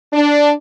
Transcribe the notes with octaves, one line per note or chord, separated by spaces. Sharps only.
D4